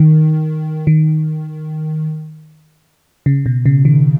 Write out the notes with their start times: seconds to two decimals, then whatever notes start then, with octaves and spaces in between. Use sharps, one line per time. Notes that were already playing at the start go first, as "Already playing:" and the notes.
Already playing: D#3
0.87 D#3
3.26 C#3
3.46 B2
3.66 C#3
3.85 D#3